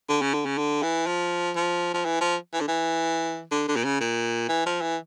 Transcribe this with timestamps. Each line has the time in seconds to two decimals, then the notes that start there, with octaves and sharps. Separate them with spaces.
0.09 D3
0.21 C#3
0.34 D3
0.45 C#3
0.58 D3
0.83 E3
1.06 F3
1.56 F3
1.94 F3
2.05 E3
2.21 F3
2.54 E3
2.61 D3
2.68 E3
3.51 D3
3.68 D3
3.76 A#2
3.84 C#3
4.00 A#2
4.49 E3
4.66 F3
4.82 E3